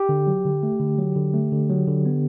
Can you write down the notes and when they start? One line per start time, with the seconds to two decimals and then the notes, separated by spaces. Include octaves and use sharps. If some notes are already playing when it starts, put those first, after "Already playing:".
Already playing: G4
0.09 D3
0.27 F#3
0.45 D3
0.63 A3
0.80 D3
0.99 F#3
1.16 D3
1.34 A3
1.52 D3
1.70 F#3
1.88 D3
2.06 B3